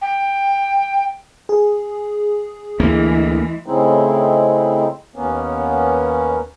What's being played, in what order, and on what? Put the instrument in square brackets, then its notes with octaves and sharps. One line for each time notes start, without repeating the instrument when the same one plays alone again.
[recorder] G5
[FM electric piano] G#4
[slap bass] D2 A#3 [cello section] E3 G#3
[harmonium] A2 C#3 G#3 C4 D#4 E4
D#2 A#3 B3 C#4